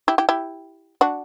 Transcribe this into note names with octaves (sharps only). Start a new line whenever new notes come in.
E4 G4
E4 G4
E4 G4
D4 F#4